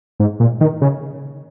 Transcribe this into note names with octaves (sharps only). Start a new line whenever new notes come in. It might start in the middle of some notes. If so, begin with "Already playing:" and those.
G#2
A#2
D#3
C#3